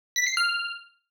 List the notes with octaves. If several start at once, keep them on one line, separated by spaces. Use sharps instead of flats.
B6
C7
F6